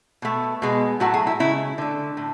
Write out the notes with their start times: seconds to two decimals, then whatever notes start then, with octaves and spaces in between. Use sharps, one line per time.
0.22 B2 A3
0.62 B2 G#3
1.00 A2 F#3 A3 F#4
1.14 G#4
1.27 E4
1.40 C#3 G#3 E4
1.78 D3 A3
2.17 A2